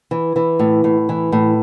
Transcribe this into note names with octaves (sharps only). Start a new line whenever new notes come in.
E3
E3
A2
A2
E3
A2